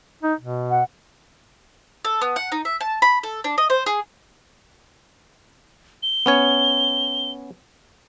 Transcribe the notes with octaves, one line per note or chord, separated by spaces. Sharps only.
D#4
B2
F#5
A4
B3
F#5
D#4
E5
A5
B5
A4
D4
D#5
C5
G#4
G7
B3 C#4 C#5